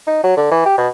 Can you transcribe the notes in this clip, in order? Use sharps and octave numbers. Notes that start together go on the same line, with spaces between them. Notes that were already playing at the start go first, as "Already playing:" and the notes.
D#4
F#3
D3
E3
G4
B2